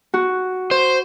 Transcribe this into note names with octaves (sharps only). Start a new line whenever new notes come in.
F#4
C5